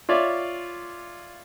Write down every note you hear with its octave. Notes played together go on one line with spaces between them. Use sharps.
F4 C#5 D5 E5